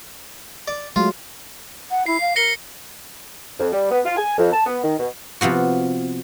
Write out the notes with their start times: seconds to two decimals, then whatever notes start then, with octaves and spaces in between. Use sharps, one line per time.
0.68 D5
0.96 F#3 G#3 A3 F4
1.90 F#5
2.06 E4 C7
2.20 F5
2.36 A#4 A#6 C#7 G7
3.60 F2
3.73 G3
3.91 B3
4.05 F4
4.17 G#5
4.38 F2
4.53 A5
4.66 B3
4.83 D#3
4.99 B2
5.41 C3 F3 B3 F#4